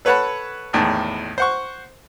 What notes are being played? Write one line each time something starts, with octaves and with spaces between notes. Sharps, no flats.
A4 B4 C#5 F#5 A5 B5
G#1 E2 A2 D#3 A5
C5 F#5 C#6